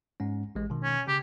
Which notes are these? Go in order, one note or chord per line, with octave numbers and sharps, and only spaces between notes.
G#2 G#3 C#4
A1 G#3
B2 D#3
C#4
C#3 G4